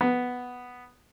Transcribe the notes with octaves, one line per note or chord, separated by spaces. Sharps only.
B3